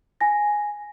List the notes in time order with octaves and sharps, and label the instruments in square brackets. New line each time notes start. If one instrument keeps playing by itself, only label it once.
[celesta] G#5 A#6